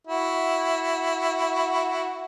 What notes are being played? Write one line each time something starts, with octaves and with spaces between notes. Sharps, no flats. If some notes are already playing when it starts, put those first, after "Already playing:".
E4 F#4